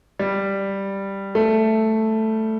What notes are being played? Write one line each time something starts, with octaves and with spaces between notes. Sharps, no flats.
G3
A3